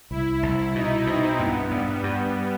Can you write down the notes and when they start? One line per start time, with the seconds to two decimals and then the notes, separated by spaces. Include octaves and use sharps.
0.11 C2 E4
0.43 C2
0.75 B2 D#4
1.07 B2 C4
1.39 G2 B3
1.71 G2 G3
2.03 G2 G3